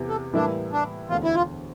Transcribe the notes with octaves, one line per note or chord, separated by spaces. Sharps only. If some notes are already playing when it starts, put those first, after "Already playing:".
Already playing: E2 C3 E3
A4
A2 E3 G3 A#3 D4 E4
D4
E1 D2 D3 F4
E4
F4